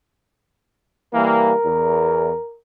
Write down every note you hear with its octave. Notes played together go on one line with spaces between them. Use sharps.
E3 G3 A#3 A#4
E2